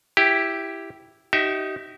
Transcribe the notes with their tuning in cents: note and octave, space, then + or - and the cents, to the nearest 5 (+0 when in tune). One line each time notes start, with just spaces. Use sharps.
E4 +0 G4 +0
D#4 +0 G4 -40 E5 +0